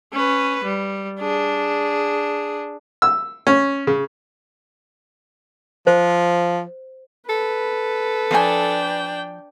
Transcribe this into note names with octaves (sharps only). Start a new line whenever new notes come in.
C#4 B4
G3
D4 G#4
E6
C#4
C#3
F3 C5
A4 B4
F3 D4 G5 G#5